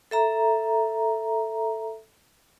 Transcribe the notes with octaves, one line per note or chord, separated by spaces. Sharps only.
A4 E5 A#5